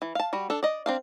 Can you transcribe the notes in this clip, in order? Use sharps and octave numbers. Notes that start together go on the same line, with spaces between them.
E3
F5 A5
G3 F#4
D4 A4
D5 D#5
C4 D4 F5